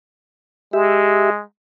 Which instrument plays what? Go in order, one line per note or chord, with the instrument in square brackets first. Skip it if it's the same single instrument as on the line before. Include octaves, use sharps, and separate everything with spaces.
[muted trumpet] G#3 [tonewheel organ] G4 E5